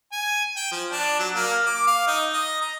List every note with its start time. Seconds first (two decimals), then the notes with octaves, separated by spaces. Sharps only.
0.12 G#5
0.57 G5
0.72 F3
0.92 D4
1.19 F#3
1.35 A#3
1.66 D6
1.87 F5
2.07 D#4
2.33 D#5
2.61 A#5